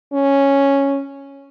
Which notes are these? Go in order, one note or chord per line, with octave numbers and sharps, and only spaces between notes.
C#4